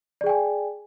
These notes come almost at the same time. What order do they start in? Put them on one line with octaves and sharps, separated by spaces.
D5 G#4 G5 G#5